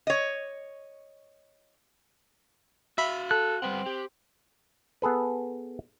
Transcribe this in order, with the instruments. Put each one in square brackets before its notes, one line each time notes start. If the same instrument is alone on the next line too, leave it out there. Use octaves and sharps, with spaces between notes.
[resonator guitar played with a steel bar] C#5 D#5
[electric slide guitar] F#4 F5 [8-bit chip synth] E5 B5
[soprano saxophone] A4 [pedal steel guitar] F#6
[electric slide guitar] G3 B4 F#5 [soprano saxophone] C4
[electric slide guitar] G4
[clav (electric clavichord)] B3 G#4 A4 B4